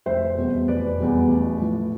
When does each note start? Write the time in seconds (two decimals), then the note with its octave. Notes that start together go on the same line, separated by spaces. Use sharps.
0.06 F1 C5 E5
0.37 E2 B2 G3
0.68 F1 B4 D5
0.99 E2 B2 G3
1.29 A1
1.60 A2 F3